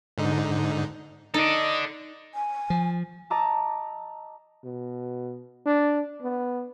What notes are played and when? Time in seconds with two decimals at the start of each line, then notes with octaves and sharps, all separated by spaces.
0.18 G#2 D3 D#4
1.34 D#4 A4 D5 D#5
2.35 G#5
2.70 F3
3.30 D#5 A5 A#5 D6 E6
4.65 B2
5.66 D4
6.22 B3